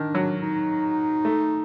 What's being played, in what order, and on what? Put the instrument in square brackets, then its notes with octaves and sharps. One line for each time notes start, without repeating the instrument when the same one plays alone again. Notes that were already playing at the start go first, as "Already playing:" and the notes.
Already playing: [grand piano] D#3 [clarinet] D4
[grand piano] F#3
[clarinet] D#4
[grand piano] A3